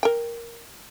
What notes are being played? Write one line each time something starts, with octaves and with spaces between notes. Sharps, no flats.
A#4 G5